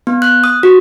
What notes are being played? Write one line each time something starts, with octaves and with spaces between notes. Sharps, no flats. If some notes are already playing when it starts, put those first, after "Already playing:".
B3
F#6
D#6
F#4